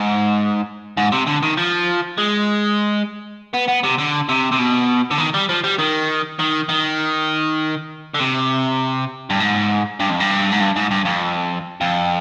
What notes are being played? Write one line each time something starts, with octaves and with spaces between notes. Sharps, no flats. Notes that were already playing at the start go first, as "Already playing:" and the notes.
Already playing: G#2
G#2
C3
D3
D#3
F3
G#3
B3
B3
C3
D3
C3
C3
B2
D3
D#3
G3
F3
G3
D#3
D#3
D#3
D3
C3
G2
G#2
G2
F2
G2
G#2
G2
G#2
G2
F2
F2